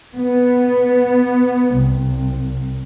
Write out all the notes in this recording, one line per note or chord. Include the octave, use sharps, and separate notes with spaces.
B3
C2